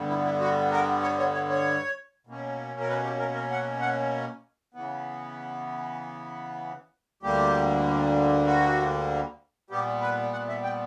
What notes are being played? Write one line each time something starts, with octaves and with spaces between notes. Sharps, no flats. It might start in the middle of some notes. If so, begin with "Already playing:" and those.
Already playing: G2 D3 G3 B3
E4
E4
F#4
A#4
C#5
C#5
C#5
C#5
B2 A#3 C#4
A#4
B4
G4
A#4
A#4
F#5
F#5
C#3 E3 B3
D2 D3 G3 A#3 G4
F#4
A#2 G3 B3 G4
B4
F#5
E5
G5